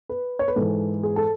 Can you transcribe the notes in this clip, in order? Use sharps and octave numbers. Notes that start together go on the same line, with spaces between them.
B4
C#5
B4
G#2 E3 A4
G#4
A4